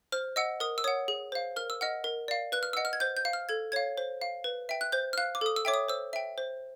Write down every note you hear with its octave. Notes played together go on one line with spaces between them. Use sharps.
C5 F6
D#5 F#5 E6
A#4 D#6
E6
C#5 F#5 D#6
G#4
C5 F5
A#4 F6
E6
D#5 F#5 F6
A#4
D5 F5
B4 F#6
F6
D#5 F#5 E6
F6
G#6
C5 G6
G6
F5
F6
A4 G#6
C#5 F5 G#6
C5
F5
B4
E5 G5
F#6
C5 G6
F6
F5 F#6
D6
A4 D#6
E6
C#5 E5 G5 D6
D#6
C5 E6
E5 G5
C5